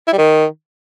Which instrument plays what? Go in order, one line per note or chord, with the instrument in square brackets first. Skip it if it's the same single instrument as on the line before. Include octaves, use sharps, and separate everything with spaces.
[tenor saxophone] E4
G3
D#3